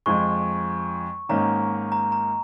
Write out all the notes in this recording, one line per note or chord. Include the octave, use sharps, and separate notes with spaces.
F2 F3 G#3 C#6
G#2 D#3 A#3 C#4 A#5
A#5
A#5